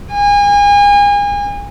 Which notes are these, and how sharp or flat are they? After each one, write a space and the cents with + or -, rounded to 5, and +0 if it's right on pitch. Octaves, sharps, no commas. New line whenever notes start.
G#5 -35